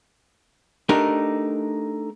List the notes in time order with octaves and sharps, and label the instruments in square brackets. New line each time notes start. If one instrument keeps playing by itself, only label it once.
[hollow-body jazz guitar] A3 D4 D#4 G4 A#4